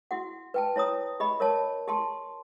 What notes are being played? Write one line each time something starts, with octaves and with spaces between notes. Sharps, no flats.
E4 F#4 F#5
B4 G5 A5
E4 C#5 A#5 D#6
G4 D#5 B5
A#4 C#5 A5
G4 A5 C6